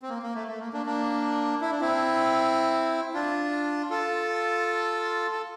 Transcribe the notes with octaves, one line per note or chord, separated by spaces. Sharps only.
C4
A#3
A#3
A3
A3
A#3
A#3 D4
A#3 D4
E4
D4
C4 E4
D4 F4
F4 A4
A4